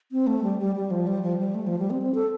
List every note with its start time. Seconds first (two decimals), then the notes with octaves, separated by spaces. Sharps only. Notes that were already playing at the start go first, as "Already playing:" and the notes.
0.12 C4
0.27 A3
0.43 G3
0.59 G3
0.75 G3
0.91 F3
1.07 G3
1.22 F3
1.38 G3
1.55 A3
1.67 F3
1.79 G3
1.90 C4
2.02 C4
2.15 A4